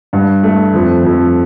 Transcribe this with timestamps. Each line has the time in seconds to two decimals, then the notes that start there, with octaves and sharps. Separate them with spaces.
0.13 G2
0.43 A3
0.73 F2
1.04 F2